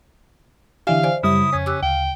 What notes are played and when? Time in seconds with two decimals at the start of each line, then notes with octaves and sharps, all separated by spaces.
0.87 D3 E3 G4 D5 E5 F5 G#5
1.04 C5 D5 G#5
1.23 F#2 C#3 G3 E4 E5 D#6
1.53 F2 C#4 G#6 B6
1.66 G4 D6 E6 F#6
1.83 D2 F5 G5